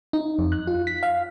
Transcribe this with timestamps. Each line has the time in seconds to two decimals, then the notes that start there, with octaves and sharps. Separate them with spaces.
0.13 D#4
0.39 F2
0.52 F#6
0.67 F4
0.87 B6
1.03 F5